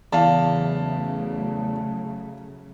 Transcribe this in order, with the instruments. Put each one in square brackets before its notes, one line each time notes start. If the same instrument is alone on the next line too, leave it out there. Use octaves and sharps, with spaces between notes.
[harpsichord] E2 [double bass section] C#3 F#3 A3 [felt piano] F5 A5